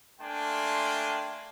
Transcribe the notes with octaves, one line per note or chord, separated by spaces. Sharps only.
A3 A#3 D4 G5 G#5 C6